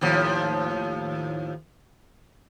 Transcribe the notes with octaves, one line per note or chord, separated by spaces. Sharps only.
D#2 A2 F3